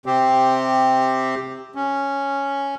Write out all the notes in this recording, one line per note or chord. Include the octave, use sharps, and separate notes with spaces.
C3 C4 G4
C#4